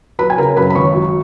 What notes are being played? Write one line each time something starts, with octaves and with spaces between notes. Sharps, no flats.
F#3 B4 B5
G#5
C#3 A#4 A#5
F#2 B4 B5
B5
G#1 C#5 C#6
F#3